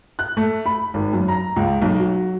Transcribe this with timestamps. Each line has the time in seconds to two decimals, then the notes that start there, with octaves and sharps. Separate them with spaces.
0.19 F#6
0.37 A3
0.66 B5
0.94 G#1
1.13 F#2
1.28 A#5
1.56 C#2
1.82 B1
2.00 F#3